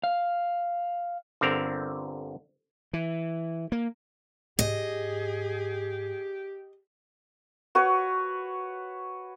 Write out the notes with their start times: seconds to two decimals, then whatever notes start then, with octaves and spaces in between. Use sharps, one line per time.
0.04 F5
1.41 G1 D3 C4 A#4 A#5
2.93 E3
3.72 A#3
4.59 G#2 E4 G4 G#4 D#5
7.75 F#4 B4 C#5